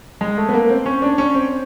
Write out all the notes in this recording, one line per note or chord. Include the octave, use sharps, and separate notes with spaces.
G#3
A3
B3
A#3
C4
C#4
D4
C#4
C4